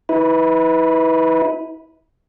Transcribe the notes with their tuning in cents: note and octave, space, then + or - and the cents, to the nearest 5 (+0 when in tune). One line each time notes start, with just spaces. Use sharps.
E4 -40 B4 +0